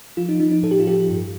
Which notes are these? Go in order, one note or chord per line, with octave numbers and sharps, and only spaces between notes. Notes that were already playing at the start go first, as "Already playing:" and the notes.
F3 F4
D#4
F3 D#4
D#4
A2 A4
G4
F4
F3 G4
G2